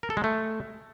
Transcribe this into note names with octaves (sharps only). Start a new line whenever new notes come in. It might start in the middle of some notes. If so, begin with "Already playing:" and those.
A#4
A4
G#3
A3